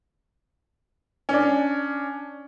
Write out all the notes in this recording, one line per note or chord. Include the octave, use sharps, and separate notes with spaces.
C#4 D4